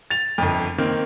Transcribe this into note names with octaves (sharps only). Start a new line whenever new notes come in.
A6 F7
G1 F2
D#3 A#3 C4